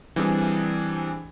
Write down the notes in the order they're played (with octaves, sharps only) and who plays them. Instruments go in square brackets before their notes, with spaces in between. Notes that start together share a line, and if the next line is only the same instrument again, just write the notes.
[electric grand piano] E3 G3 C4 D4 G#4